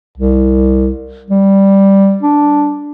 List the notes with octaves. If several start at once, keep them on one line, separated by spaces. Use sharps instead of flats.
C2
G3
D4